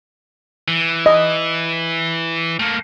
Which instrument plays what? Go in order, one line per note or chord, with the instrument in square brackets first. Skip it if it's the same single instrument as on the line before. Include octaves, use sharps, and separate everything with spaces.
[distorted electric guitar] E3
[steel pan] D#5
[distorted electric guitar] A3 A#3